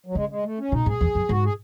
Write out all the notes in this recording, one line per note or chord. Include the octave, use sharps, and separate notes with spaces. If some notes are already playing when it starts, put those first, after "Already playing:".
F#3
C#3 G#3
G#3
A3
C#4
B2 D#4
G#2 G#4
E2
F#2
G#2 F#4
G#4